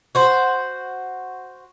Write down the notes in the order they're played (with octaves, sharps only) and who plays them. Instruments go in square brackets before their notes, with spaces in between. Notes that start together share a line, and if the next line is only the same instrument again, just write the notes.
[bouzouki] F#4 C5